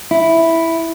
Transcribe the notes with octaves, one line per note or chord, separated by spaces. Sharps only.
E4